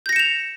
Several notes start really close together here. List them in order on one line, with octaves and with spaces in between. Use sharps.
G6 A#6 C#7 E7 F7